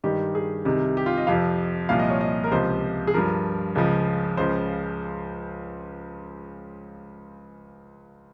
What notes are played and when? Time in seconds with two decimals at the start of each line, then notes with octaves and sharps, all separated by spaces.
0.04 G2 D#3 G4
0.35 G#4
0.65 C2 C3 D#3
0.97 G4
1.06 F4
1.17 D#5
1.27 F2 C3 F3 F5
1.89 C2 A#2 F3 F5
1.99 D#5
2.10 C#5
2.21 D#5
2.44 A#4
2.51 C#2 C3 F3 C5
3.07 G#4
3.14 G2 F3 A#4
3.75 C#2 C#3 F3
4.37 C#2 C#3 F3 C5